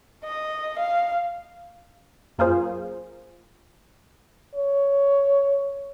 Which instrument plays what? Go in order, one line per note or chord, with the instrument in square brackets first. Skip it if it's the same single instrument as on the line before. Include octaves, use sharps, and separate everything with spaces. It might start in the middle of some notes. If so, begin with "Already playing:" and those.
[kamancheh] D#5
F5
[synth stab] F#2 A#3 F4 G#4 C5
[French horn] C#5